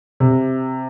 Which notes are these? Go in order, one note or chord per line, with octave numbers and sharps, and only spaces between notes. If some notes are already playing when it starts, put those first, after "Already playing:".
C3